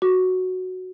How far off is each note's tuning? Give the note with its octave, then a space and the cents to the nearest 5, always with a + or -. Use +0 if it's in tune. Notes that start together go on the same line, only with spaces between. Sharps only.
F#4 +0 D6 +0